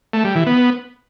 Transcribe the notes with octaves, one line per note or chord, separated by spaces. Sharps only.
A3
G3
E3
B3